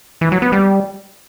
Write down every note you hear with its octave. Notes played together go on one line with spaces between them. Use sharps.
E3
F#3
B3
G3